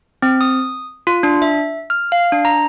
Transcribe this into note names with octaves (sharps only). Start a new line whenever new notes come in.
C4
D#6
F4
D4
E5
F6
F5
D4
A#5